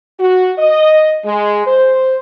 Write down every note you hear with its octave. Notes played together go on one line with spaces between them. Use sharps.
F#4
D#5
G#3
C5